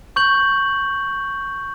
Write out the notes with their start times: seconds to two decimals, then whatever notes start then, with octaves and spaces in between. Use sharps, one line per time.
0.16 C#6 G6 F#7